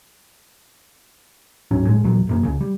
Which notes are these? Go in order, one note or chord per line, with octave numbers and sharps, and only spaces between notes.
D1 G#2 F#3 C#4
F1 A2 G#3
A#1 E2 A#2 F#3
E1 F#2 A#3
C#2 C#3
G3